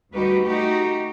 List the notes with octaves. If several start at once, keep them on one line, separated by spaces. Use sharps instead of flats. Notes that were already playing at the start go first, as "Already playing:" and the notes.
D2 G3 D#4 F#4 G4 B4
A3 D#4 F#4 G4